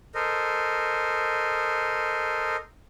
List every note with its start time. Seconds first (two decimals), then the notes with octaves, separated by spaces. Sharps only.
0.15 A4 A#4 C5 D#5